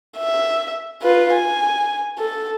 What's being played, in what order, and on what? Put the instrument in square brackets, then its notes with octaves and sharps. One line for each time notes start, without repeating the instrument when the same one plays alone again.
[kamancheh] E5
F4 B4
G#5
A4